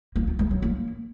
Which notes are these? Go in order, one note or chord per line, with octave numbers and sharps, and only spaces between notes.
A#3
F4
G#3
F#3
A#3